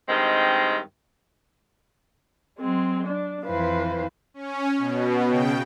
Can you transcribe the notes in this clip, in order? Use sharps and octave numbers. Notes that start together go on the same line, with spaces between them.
G2 D#3 G#3 C4
F#3 G#3 C4
D4
F2 E3 B4 C5 F5
C#4
B2
C#3 G5